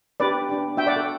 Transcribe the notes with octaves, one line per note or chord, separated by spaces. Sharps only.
B3 D4 G4 B4 D5
B3 D4 G4
B3 D4 F#4 E5 G5
D5 F#5
A4